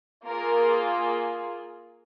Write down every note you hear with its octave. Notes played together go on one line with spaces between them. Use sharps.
A#3 F4 G#4 A#4